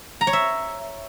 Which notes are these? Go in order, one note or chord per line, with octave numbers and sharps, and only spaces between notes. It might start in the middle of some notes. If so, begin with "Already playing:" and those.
A#5
C#5
E5